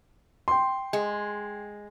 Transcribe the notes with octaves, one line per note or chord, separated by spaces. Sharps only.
G5 C6
G#3